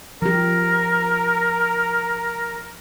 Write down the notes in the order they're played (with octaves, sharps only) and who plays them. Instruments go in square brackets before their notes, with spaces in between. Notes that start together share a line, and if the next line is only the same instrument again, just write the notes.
[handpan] F3 G4 [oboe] A#4